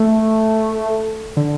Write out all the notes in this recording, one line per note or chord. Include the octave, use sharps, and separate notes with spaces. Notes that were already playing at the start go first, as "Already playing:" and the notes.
Already playing: A3
D3